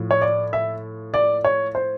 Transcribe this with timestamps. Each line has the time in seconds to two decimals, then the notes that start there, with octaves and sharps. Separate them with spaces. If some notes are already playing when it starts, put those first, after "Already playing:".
Already playing: A2 F3
0.11 C#5
0.21 D5
0.53 E5
1.14 D5
1.45 C#5
1.75 C5